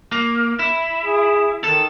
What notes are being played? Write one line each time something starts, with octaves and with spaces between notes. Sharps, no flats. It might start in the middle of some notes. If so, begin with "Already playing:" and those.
A#3
E4
G#4
D#3 A4